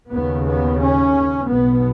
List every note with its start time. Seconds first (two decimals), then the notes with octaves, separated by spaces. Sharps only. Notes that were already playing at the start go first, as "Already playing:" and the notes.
0.13 D#2 C#3 B3
0.47 B3
0.81 C#4
1.48 B1 B2 B3